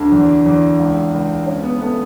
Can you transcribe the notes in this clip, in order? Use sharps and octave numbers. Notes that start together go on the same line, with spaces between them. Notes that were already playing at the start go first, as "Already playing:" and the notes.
Already playing: D2 D4
E2
E2
C#2
C#2
C#2 C#4
B3
A3 B3